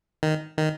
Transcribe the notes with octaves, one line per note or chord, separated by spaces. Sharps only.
D#3
D#3